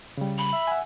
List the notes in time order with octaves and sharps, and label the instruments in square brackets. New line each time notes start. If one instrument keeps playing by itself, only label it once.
[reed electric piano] C#3 G3
[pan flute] B5
[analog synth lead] E5
[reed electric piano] F#5 G#5